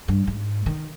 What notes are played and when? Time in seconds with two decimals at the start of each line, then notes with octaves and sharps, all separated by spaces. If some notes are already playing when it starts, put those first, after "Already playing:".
0.08 G2
0.27 G#2
0.66 D#3